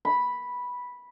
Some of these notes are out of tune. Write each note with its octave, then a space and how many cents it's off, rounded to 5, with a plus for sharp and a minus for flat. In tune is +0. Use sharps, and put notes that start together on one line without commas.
B5 -5